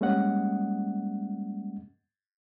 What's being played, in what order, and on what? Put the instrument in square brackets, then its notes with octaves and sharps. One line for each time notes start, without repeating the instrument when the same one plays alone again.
[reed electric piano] G3 G#3 A#3 C#4 D#5 F#5